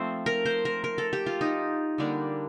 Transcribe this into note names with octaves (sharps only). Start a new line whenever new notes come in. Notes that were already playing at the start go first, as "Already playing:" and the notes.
Already playing: F3 A3 C4 C5
A#4
C5
A#4
A#4
A4
G4
F4
D#4
D3 G3 A#3 D4